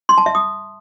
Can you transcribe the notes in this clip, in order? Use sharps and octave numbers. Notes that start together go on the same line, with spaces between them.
C6
A5
E5
D#6